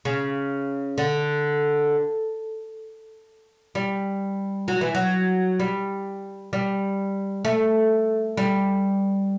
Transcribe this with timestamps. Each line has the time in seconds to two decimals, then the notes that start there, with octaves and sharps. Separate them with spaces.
0.05 C#3
0.98 D3
3.75 G3
4.68 F#3
4.81 E3
4.95 F#3
5.60 G3
6.53 G3
7.45 A3
8.37 G3